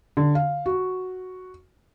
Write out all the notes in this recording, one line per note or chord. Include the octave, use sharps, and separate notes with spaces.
D3
F5
F#4